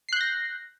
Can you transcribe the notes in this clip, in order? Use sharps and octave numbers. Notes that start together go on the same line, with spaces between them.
F#6 G6 A#6 C7